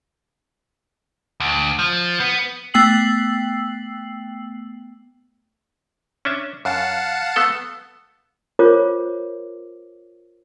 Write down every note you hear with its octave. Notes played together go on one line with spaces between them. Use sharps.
D2
F3
B3
A3 B3 G5 E6 C7 F#7
C#4 D4 E5
F#2 F5 F#5 A5
A3 B3 A4
F4 A#4 C5 C#5 D6